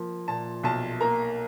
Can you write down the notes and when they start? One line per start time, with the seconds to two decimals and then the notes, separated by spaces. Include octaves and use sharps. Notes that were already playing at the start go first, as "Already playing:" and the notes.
Already playing: F3 A#3
0.28 A#2 A5
0.63 B1 A5
1.01 A#3 A#5